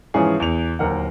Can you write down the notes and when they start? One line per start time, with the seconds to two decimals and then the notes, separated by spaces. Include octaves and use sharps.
0.14 G#2 E3 F3 C#4 G#4
0.40 E2 F7
0.79 D1 D#2 A#4 F#5